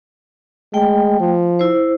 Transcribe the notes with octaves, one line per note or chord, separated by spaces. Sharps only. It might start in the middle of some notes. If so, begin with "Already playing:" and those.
G#3 A3 G5
F3
E4 C5